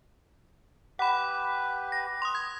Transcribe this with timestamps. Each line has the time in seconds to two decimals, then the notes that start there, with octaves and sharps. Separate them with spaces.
0.99 G4 B4 F#5 B5
1.92 A#6
2.22 C6 D#6
2.35 G#6